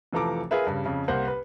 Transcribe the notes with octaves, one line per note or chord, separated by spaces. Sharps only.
F1 E3 F3 A4 A#5 D6
F4 G#4 A#4 B4 E5
G2 C#3
F2 C#3
C2 A#3 C5 F#5
B4